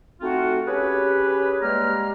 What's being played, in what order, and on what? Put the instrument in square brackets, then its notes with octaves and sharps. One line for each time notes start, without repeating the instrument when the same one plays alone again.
[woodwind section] A3 C4 D#4 F4 F#4
C#4 G4 G#4 B4
G3 G#3 A#3 A#5 F6